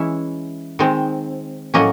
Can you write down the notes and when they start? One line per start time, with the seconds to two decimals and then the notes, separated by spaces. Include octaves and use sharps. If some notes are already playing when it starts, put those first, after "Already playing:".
Already playing: E3 G#3 C#4 E4 E5
0.79 D#3 G#3 C4
1.74 A2 F#3 A#3 C#4 D#5